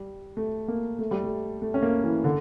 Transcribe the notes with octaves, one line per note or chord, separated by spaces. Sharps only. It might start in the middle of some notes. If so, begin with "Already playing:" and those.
Already playing: G3
A3
A#3
A3
G3
A3
A3
C#4
A#3
E3
D3